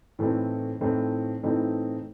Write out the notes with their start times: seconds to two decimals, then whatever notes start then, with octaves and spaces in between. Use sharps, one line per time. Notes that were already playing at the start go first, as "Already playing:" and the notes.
0.19 A2 E3 A3 C4 D#4
0.81 A2 E3 A3 C4 D#4
1.43 A2 E3 A3 C4 D#4